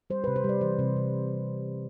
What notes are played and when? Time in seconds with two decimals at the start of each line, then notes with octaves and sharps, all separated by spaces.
0.10 G3 C5
0.24 B4
0.27 C3
0.36 C5
0.44 G3 D5
0.61 E3 C5
0.79 C3
0.96 C3